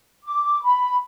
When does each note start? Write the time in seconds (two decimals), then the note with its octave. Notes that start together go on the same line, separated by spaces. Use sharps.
0.23 D6
0.62 B5